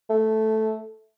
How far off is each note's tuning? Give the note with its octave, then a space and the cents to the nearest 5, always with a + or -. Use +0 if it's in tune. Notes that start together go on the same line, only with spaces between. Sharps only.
A3 -5